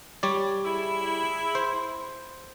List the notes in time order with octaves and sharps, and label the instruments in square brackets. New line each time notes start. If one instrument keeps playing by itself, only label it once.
[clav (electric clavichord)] G3 C#5 D5
[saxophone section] E4 G#4
[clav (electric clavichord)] C5